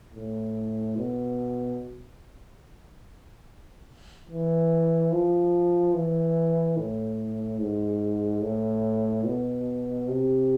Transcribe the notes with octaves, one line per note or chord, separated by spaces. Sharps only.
A2
B2
E3
F3
E3
A2
G#2
A2
B2
C3